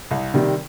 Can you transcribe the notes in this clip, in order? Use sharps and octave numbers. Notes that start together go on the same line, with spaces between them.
C2
C3 D#3 G3